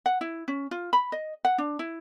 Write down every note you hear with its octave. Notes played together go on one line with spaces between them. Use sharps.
F#5
E4
C#4
F4
B5
D#5
F#5
D4
E4